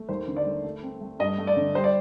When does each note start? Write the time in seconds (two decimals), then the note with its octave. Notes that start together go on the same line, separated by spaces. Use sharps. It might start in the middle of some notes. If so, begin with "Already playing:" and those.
Already playing: A3
0.09 D#2 C5
0.28 D3
0.36 D5
0.46 A3
0.64 A3
0.82 C4
1.01 A3
1.19 G2 D#5
1.38 A3
1.47 D5
1.56 D3
1.75 G3 C5
1.84 D5